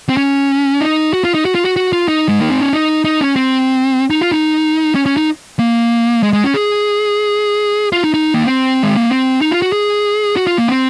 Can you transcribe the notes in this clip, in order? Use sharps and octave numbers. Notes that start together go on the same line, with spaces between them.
C4
C#4
D#4
F#4
F4
D#4
F#4
F4
F#4
F#4
F4
D#4
G#3
A#3
C4
C#4
D#4
D#4
C#4
C4
D#4
F4
D#4
C#4
C#4
D#4
A#3
G#3
G#3
C#4
G#4
F4
D#4
D#4
A#3
C4
G#3
A#3
C4
D#4
F4
F#4
G#4
F#4
F4
A#3
C4